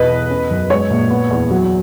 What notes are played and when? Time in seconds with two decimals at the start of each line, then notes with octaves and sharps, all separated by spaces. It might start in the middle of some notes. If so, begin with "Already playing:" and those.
Already playing: B1 E2 B4 D#5
0.10 E2
0.30 C#4
0.50 F#2
0.70 G#3 C#5
0.90 A#1
1.10 B3
1.31 E2
1.51 F#3